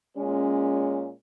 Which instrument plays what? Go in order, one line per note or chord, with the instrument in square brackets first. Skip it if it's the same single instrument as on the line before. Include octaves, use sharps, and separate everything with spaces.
[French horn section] A#2 G#3 C#4